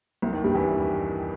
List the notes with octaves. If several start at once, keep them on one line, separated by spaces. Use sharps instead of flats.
C2 C3
D#2 D#3
G2 G3
E2 E3